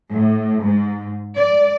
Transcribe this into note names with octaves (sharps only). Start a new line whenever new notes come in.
A2
G#2
D5